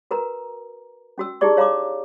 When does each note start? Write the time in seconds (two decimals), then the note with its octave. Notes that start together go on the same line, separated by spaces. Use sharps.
0.11 F#4 A#4 B4 A#5
1.18 C#4 F#4 E6
1.41 D#4 E4 G4 G#4 D5 C#6
1.57 C#5 F5 A#5 C6 D6